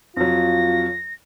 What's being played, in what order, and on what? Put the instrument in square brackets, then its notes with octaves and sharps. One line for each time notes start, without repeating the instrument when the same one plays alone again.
[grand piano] F2 F#3 [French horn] F4 [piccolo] A#6